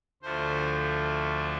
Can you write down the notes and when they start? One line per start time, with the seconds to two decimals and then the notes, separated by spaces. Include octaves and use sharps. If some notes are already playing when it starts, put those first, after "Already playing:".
0.23 D2 D3 F3 A3 C5